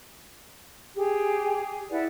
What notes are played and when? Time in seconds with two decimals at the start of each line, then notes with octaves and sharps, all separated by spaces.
0.95 G4 G#4
1.91 E4 B4 D5 F#5